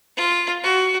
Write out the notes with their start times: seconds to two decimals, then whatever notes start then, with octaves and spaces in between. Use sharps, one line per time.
0.17 F4
0.64 F#4